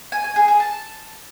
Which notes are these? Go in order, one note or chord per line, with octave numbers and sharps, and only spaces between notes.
G#5
G#5
G#4
G#4
A5